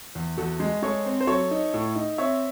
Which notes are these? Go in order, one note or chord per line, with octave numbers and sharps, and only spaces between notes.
E2
E2 F#4 A4
G#3
G#3 A4 C#5
C4
C5
F#3 A4 C#5
D#4
A2
D#4
C4 C#5 E5